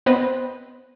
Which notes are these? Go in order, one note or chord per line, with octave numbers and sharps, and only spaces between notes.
B3 C4 B4 C5 D#5